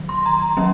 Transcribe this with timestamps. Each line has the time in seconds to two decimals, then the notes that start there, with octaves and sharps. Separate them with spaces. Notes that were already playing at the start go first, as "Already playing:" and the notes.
Already playing: D#3 F#3
0.09 C6
0.26 A#5
0.57 F#3 A#3 C#4